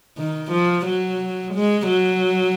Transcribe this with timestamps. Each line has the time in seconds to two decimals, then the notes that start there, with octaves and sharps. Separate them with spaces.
0.18 D#3
0.52 F3
0.86 F#3
1.54 G#3
1.88 F#3